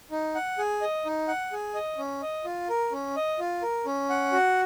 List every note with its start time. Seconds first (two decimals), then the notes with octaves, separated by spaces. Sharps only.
0.11 D#4
0.35 F#5
0.58 G#4
0.81 D#5
1.05 D#4
1.28 F#5
1.52 G#4
1.75 D#5
1.98 C#4
2.22 D#5
2.45 F4
2.69 A#4
2.92 C#4
3.16 D#5
3.39 F4
3.62 A#4
3.86 C#4
4.10 F#5
4.32 F#4